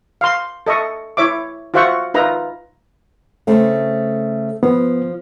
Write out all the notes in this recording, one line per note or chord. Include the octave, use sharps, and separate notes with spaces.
F5 C6
A4 D#5 E5 C#6
E4 C#5 E5 D6
F4 F#4 C5 E5 F#5 C#6
D#4 F4 B4 E5 A#5
C#3 A3 C4
F3 B3